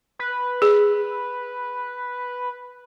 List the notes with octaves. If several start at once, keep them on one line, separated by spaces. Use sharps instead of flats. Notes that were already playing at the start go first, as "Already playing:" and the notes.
B4
G#4